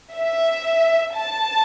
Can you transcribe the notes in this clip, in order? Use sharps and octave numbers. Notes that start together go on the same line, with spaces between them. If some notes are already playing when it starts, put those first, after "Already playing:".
E5
A5